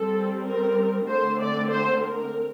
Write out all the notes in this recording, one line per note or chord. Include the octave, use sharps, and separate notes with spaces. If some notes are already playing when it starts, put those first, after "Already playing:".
Already playing: G3 C4 A4
A#4
D3 A3 C4 C5
D5
C5
A#4